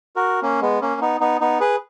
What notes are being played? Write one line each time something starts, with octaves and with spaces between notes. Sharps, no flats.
F#4 A#4
A#3 C#4
G#3 B3
A#3 C#4
B3 D#4
B3 D#4
B3 D#4
G#4 B4